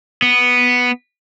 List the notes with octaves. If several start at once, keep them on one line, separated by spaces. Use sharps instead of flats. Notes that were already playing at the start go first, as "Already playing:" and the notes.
B3